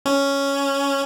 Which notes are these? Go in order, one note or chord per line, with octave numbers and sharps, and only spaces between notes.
C#4